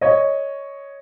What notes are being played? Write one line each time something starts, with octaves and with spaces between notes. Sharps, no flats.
C#5 D#5